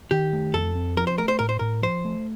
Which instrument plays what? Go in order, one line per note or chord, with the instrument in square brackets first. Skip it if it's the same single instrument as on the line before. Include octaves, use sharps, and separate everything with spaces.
[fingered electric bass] D#3 [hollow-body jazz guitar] G4
[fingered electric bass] A3
[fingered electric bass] F2 [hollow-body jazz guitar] A4
[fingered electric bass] C4
[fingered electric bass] F3 [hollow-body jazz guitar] A#4
[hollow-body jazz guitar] C5
[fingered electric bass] A3 [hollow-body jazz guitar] A#4
[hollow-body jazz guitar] C5
[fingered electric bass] A2 [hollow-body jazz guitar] A#4
[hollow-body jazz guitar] C5
[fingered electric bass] A2 [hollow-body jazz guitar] A#4
[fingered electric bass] F3 [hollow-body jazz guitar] C5
[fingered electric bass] A3